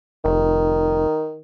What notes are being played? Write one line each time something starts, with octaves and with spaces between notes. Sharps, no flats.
F1 D#3